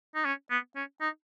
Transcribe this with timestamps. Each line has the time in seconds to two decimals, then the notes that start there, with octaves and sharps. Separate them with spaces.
0.15 D#4
0.25 C#4
0.51 B3
0.76 C#4
1.01 D#4